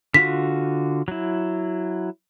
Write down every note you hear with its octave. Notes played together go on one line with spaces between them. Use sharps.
D3 F4 F#4 B6
F#3 E4